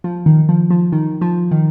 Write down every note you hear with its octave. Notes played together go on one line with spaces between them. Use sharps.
F3
D#3
F3
F3
D#3
F3
D#3